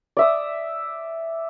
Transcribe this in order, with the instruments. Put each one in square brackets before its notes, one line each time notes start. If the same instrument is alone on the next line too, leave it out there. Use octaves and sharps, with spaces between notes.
[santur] D5 E5 D#6